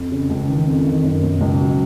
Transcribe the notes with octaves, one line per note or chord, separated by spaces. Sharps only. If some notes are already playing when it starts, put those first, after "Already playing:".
Already playing: F2
C#3
C#2
D#3
F2
D#3
F#2
B2
C#2
F#3